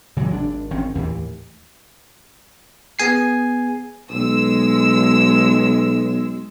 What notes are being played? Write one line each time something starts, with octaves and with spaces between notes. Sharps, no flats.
C#3 E3 F#3 G#3
G#1 D4
G#1 D#3 C4 C#4
D#2 A2 E3
B3 G#4 G#5 C7
B1 G#3 E6